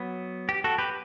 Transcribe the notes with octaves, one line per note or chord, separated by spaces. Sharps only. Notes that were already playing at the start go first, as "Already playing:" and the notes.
Already playing: F#3 B3
G4
F#4 A4
G4 B4